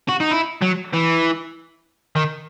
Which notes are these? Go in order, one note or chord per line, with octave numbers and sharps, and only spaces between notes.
F#4
D#4
E4
F#3
E3
D#3